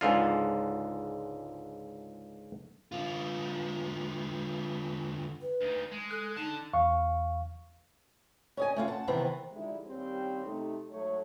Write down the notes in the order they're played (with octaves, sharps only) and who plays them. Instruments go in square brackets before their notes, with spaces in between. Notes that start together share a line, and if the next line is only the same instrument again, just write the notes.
[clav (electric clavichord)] C#2 G#2 D3 F4
[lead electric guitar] D3 F4
[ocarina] B4
[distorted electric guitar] D2 D#3
G#3
[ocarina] A4 [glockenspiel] F#6
[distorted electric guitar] D3 A5 [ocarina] D#4
[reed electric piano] E2 F5 C#6
[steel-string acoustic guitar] C#4 D#5 G#5
A3 C#4 F4
F#5 A5
C3 D#3 E3 B3 C4
[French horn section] D3 F3 G3 G#3 D#4 E4
D#2 G3 C4 C#4 G4 C5
C3 A3 D#4
G#2 F#3 A3 C#5